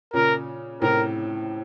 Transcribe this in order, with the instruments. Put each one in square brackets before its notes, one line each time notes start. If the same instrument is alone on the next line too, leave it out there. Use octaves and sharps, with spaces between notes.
[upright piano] A#2 C#3 [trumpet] A#4
[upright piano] A2 C3 [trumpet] A#4